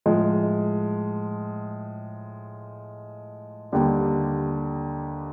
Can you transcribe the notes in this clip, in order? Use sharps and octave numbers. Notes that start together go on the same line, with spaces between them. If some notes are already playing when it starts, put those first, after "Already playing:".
A2 F3 G#3
D#2 D3 G3